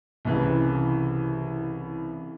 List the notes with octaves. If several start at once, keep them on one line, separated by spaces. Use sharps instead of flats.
C2 C#3 E3